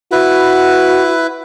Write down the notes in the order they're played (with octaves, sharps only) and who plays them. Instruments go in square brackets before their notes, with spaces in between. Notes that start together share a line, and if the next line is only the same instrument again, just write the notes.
[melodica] E4 B4 [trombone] F#4